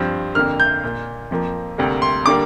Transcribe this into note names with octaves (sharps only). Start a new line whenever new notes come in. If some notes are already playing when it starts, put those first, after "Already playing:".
Already playing: G2 F3 C4
F2 D3 A#3 F6
G6
A#2 A#3
F2 F3 A#3
D2 C3 G3 A#3
C6
D3 G3 A#3 D6